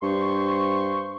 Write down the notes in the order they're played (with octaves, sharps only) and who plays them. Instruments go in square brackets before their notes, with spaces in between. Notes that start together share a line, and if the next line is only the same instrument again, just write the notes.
[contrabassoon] G2 [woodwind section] C5 C6 C#6